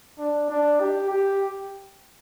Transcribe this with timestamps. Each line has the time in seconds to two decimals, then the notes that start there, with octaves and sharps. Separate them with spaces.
0.19 D4
0.50 D4
0.80 G4
1.11 G4